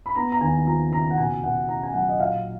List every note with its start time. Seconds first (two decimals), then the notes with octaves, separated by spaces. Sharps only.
0.06 B5
0.15 B3 A#5
0.32 A#5
0.41 D#2 G#5
0.67 F3 A#5
0.92 C#3 A#5
1.11 F#5
1.18 B2 G#5
1.43 B2 F#5
1.68 C#4 A#5
1.83 G#5
1.94 F#3 F#5
2.09 D#5
2.19 A#2 F5